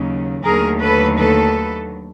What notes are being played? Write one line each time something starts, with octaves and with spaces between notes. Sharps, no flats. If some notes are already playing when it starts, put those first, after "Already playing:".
Already playing: D#2 C#3 F#3
D#2 D3 F#3 A3 G#4 A#4
A4 B4
A4 B4